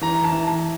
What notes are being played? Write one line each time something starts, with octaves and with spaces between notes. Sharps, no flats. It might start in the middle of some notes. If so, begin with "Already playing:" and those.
E3 A#5
A5
E3
A5